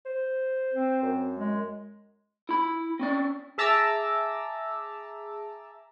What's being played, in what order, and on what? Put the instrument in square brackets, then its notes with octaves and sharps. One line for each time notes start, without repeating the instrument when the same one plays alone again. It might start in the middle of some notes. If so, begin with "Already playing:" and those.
[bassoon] C5
[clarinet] C4
[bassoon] F#2
[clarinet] G#3
[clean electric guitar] E4 B5
C4 C#4 D5
[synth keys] G#4 E5 A5 A#5 D6 E6